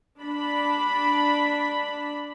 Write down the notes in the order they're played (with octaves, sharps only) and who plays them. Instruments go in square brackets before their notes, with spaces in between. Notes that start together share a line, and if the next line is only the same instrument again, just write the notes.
[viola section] D4 B5